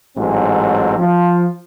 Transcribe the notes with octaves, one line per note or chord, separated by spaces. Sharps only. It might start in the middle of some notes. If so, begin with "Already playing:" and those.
A1 G#2 F#3 C4
F3